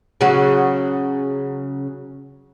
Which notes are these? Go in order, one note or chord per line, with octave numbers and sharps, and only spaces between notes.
C#3 F#3 F#4